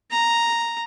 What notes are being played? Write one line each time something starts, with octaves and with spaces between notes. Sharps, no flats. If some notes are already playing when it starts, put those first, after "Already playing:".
A#5